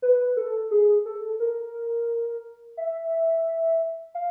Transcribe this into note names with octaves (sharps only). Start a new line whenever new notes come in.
B4
A4
G#4
A4
A#4
E5
F5